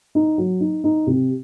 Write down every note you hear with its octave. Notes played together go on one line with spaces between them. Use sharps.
D#4
F#3
D#4
D#4
C3